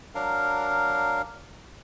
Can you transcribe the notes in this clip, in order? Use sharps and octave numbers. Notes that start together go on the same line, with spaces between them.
F#3 D4 A#4 F5